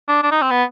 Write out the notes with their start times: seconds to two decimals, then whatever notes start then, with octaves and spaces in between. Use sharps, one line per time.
0.08 D4
0.23 D4
0.31 D#4
0.42 C4
0.51 B3